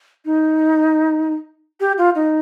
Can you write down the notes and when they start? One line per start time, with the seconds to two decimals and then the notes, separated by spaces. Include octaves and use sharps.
0.25 D#4
1.80 G4
1.98 F4
2.15 D#4